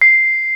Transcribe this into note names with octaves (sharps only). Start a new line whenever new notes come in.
C7